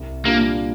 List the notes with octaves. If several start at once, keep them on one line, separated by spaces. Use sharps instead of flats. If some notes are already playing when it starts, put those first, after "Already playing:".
Already playing: C2
A#2 G3 A#3 D4 F4